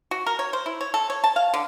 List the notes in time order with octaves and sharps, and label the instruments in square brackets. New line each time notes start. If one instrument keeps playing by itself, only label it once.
[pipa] F#4
A#4
C#5
C5
E4
C#5
A4
C#5
A5
F5
D3